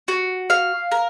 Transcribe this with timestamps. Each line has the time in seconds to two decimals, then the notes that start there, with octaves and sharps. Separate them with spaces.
0.08 F#4
0.50 F5
0.92 A#4